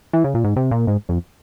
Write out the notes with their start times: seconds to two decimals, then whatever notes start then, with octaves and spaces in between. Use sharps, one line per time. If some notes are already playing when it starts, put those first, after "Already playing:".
0.13 E3
0.24 C#3
0.34 A#2
0.44 G#2
0.56 C3
0.71 A#2
0.87 G#2
1.09 F2